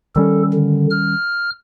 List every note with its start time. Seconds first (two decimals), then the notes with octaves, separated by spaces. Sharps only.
0.16 D#3 G3 C#4 A4
0.54 D3
0.91 F6